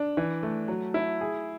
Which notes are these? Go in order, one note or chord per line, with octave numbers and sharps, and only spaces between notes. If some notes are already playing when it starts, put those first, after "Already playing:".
Already playing: D4
E3
A3
F#3
E4
G#4